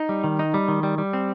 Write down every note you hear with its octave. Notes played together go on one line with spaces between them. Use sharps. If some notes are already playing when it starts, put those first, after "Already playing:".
Already playing: D#4
G3
D#3
D#4
G3
D#3
G3
G3
C4